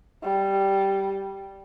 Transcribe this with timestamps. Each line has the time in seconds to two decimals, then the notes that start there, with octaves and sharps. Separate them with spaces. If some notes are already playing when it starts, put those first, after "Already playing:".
0.23 G3